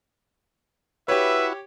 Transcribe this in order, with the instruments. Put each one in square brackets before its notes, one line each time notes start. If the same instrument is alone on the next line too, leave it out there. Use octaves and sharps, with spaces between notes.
[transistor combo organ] E4 F#4 [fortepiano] G4 C#5 [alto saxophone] B4 [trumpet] E5